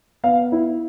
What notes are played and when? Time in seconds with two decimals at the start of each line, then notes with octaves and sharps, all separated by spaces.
0.23 B3 F5
0.52 E4